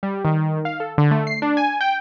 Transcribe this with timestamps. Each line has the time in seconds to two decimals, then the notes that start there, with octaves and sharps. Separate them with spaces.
0.03 G3
0.25 D#3
0.65 F5
0.80 A4
0.98 D3
1.11 A3
1.27 C7
1.42 D4
1.57 G#5
1.81 G5